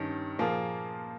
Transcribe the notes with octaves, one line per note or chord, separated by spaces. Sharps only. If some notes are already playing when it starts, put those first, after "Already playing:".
Already playing: G2 D#3 C#4
A#2 F3 A#3 F4 G#4